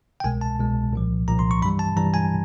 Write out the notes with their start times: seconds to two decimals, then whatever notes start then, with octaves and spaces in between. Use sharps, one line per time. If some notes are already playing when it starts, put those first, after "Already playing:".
0.20 G5
0.24 C2 B2 G#3 G#5
0.41 A5
0.59 C2 B2 G#3
0.93 C2 A#2 F3
1.28 C2 A#2 F3 A#5
1.39 C6
1.51 C#6
1.62 G2 E3 G3 B5
1.79 A5
1.96 G2 E3 G3 A#5
2.14 G#5